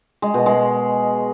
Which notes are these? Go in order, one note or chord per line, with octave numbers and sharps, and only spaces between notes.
G#3
B2
G#3